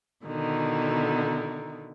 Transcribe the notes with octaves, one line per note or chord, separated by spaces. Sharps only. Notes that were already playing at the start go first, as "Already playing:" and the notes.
B2 D3 D#3 E4